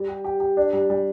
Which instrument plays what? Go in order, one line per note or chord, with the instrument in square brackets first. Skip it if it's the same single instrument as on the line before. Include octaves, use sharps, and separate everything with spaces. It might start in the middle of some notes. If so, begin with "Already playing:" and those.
Already playing: [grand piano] G3
G4
G4
G4
D4
G3
G3